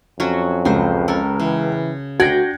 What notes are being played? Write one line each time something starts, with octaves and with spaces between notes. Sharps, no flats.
F2 F#3 C#4 F#4
C#2 F#3 C5
C#4 A4 A#4
C#3 E3
D2 D4 F#4 F#5 G5 G#6 A#6